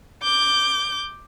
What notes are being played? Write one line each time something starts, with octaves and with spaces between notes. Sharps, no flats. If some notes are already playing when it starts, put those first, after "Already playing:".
D6 G6